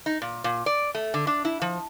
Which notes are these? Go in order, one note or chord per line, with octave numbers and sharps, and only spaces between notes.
D#4
A#2
A#2
D5
A3
D3
D4
E4
F3